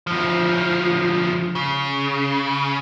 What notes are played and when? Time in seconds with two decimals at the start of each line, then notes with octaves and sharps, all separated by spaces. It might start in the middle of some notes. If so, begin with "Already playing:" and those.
0.07 D2 F3
1.55 C#3